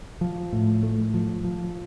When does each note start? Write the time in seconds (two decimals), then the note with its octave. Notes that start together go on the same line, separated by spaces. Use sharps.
0.21 F3
0.53 A2
0.83 A3
1.14 F3
1.44 F3